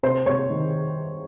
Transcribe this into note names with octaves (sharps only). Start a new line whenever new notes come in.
C3 C5
C3 C#5
D#3